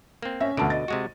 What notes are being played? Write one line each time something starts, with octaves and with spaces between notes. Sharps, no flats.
A#3 C4
C#4 E5 A#6
D2 B2 D3 A5 D7
D#5 A6
C3 G#3 F#4